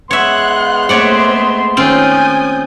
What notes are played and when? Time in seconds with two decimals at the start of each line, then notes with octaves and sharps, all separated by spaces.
0.11 G#3 B3 C#5 E5 F#5 C6 F#6
0.89 A3 A#3 C4 G#4 C#5 D5 E5 F#5
1.77 D#3 C4 C#4 F4 C#5 G#5 D#6 G6